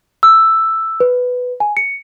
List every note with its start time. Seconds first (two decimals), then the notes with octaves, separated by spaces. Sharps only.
0.23 E6
1.00 B4
1.60 G#5
1.77 C#7